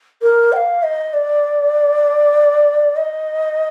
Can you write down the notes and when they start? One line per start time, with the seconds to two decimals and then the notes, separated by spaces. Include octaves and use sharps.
0.22 A#4
0.52 G5
0.56 F5
0.83 D#5
1.13 D5
2.96 D#5